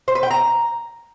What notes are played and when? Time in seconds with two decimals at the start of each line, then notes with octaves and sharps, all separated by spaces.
0.08 C5
0.15 B4
0.23 G5
0.31 A#5